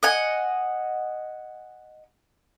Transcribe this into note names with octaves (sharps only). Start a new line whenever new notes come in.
D#5 F#5 G#5